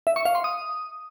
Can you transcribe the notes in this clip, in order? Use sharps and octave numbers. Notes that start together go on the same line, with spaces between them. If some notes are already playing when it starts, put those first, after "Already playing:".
E5
C#6
F5
C6
D#6